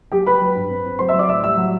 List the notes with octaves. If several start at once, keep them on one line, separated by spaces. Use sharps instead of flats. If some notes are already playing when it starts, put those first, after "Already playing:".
F#3 G4 G5
F#3 B4 B5
F#3
G2
C4
C4
F#3 C5 C6
E5 E6
F#3
D5 D6
A2 E5 E6
G3 E5 E6
F#3